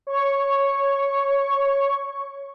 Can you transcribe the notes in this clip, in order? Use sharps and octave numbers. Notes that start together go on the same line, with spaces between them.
C#5 C#6